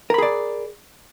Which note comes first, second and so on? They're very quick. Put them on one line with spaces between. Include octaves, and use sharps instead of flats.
A#4 B5 G#4 D5